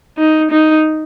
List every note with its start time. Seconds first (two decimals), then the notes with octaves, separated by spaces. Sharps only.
0.18 D#4
0.51 D#4